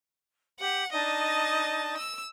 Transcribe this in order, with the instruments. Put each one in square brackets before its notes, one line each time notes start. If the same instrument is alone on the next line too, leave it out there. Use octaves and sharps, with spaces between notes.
[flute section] G4 [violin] F#5
[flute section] D4 D#4 D5 [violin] D#5 A5
[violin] E6